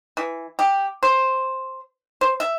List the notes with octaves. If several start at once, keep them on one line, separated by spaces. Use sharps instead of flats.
E3
G4
C5
C5
E5